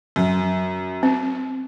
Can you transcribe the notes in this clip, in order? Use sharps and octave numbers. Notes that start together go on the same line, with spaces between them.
F#2
C4